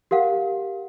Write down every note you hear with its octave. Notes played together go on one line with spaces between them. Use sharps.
G4 A#4 F5 F#5